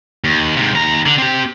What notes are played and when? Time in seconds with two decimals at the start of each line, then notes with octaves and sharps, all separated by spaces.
0.24 D#2
0.57 G#2 C3
0.75 D#2 A#5
1.06 D3
1.18 C4 G4